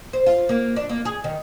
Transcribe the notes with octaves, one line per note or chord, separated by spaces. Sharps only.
C5
F4
A#3
D4
A#3
G#4
D#3